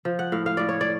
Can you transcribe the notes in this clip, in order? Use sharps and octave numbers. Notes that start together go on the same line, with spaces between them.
F3
F#5
A2 F5
F5
A2 D5
C#5
D5